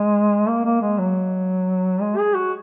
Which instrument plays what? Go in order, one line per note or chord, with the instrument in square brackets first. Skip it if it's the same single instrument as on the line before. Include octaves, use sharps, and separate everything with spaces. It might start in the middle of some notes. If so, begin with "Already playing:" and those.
Already playing: [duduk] G#3
A#3
A#3
G#3
F#3
G#3
G#4
F#4